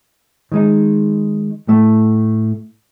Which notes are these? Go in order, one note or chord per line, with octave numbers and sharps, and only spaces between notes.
D#3 G#3 D#4
A2 A3